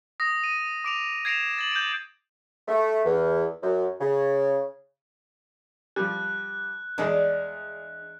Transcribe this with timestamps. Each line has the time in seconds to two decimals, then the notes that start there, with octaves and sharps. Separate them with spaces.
0.20 D#6 A#6
0.44 D#7
0.84 D6 D7 F7
1.25 G#6 A#6 C7 D7 E7 F7
1.58 A6 F#7
1.71 G6 D7
2.68 A3
3.05 E2
3.62 F#2
4.00 C#3
5.96 F3 G3 F#6
6.98 E2 G#3 D4